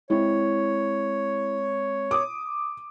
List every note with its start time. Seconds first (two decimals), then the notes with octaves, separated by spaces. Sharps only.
0.10 G#3 C4 E4 C#5
2.11 D6 D#6